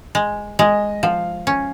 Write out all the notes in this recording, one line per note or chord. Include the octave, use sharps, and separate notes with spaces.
G#3
G#3 D#5
F3 F5
C#4